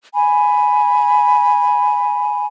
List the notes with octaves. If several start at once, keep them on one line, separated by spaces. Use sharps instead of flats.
G#5 B5